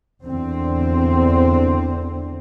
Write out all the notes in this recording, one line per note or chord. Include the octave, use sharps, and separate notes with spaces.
E2 D3 C4